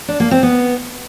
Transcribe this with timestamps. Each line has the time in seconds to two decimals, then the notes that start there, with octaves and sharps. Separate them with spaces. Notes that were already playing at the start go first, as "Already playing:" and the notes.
0.08 D4
0.20 A#3
0.31 C4
0.43 B3